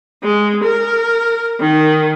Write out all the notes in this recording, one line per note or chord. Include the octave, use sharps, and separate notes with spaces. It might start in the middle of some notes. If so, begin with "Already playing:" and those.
G#3
A#4
D#3